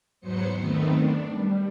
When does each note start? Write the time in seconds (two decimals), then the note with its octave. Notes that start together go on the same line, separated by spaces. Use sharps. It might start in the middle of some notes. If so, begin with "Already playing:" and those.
0.20 E2 G#2 F#3 B3 C5 C#7
0.56 D#3 A3 B3 C4
0.94 D4
1.32 G3